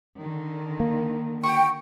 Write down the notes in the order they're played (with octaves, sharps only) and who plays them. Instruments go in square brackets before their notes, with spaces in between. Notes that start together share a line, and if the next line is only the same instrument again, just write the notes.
[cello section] D3 D#3
[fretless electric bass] A#3
[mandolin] F#4 C#6 [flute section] G5